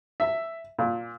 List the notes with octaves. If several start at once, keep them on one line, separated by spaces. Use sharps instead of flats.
E5
A#2